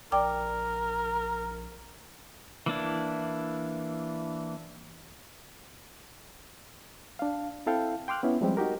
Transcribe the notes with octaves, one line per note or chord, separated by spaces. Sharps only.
A#1 A#4 D5 G5 D6
E3 A#3 D4 E4
D4 F5
C4 E4 A4 F5 G5
G5 C6 D6 F6 F#6
B3 C#4 E4
F3 G3 G#3 C4 G4
D#4 F#4 G4 A#4